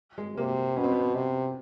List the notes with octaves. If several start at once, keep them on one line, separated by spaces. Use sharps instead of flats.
G#3
C3 A#3
B2 C#4
C4
B3
C4
C3